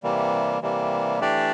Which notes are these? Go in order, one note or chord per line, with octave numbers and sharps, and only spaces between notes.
C3 E3 G3 A#3
C3 E3 G3 A#3
E3 A3 D4 G4 D5